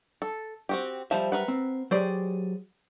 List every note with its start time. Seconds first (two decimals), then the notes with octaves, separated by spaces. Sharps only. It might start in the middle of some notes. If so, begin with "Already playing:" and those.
0.22 A4
0.69 C4 F#4 G4
1.11 F3 G3 C5 E5
1.32 A#4 B4 F#5
1.48 C4
1.91 F#3 G4 G#4 C5 D5